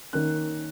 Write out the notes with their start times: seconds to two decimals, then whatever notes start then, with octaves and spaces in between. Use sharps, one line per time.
0.13 D#3 A#3 C#4 F#6